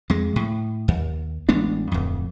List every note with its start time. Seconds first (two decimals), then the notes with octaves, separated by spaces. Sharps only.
0.10 F2 G#3
0.36 A2
0.88 D#2
1.49 A1 G#3 B3 D4
1.92 D1 F2